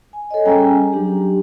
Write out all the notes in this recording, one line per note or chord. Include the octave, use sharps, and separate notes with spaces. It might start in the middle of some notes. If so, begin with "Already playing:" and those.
G#5
A4 C#5 D#5
G3 C#4 G#4 G5 G#5 A#5
F#3 D4 G4